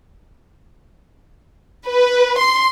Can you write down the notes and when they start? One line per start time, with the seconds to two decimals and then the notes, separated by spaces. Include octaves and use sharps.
1.87 B4
2.40 C6